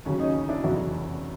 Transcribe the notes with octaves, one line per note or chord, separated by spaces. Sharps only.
D#2 C#3 F#3 C#4
C#4 D#4
D4 E4
F1 E2 C#3 F#3 E4 F#4